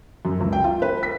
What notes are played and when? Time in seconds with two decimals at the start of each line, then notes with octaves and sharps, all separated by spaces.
0.25 F#2
0.40 C#2
0.53 G5
0.64 F4
0.82 B4
1.03 B6